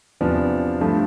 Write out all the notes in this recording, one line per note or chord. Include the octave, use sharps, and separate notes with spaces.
E2 C3 F3 B3 D4
G2 F3 A3